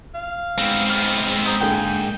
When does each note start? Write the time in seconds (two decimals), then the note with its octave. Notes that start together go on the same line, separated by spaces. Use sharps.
0.15 F5
0.58 G#2 B3 C4
0.90 F6 D#7
1.46 A#5 D#6 G6
1.60 D3 A#3 G#4 G5